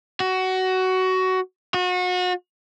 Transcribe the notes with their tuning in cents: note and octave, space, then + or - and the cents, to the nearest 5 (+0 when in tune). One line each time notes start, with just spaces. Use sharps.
F#4 +15
F#4 -35